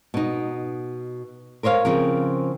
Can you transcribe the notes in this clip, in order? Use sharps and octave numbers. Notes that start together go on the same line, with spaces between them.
B2 D#4
A#4 C5 C#5 D#5 F5
C#3 F3 C4 A#4